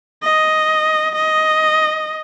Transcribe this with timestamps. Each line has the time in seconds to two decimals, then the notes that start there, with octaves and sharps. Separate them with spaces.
0.23 D#5
1.16 D#5